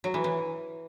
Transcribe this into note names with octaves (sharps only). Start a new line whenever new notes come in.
F#3
E3
E3